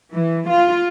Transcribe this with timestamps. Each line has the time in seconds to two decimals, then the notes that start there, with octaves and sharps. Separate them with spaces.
0.13 E3
0.49 F4